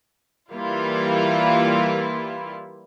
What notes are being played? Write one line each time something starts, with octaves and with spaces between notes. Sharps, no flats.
E3 G3 A#3 E4 F4